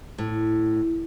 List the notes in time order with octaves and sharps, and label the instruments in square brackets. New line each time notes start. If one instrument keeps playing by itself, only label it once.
[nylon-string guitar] A2